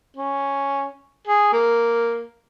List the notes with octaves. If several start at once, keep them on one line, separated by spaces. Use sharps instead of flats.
C#4
G#4
A#3